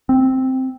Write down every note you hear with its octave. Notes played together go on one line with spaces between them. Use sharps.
C4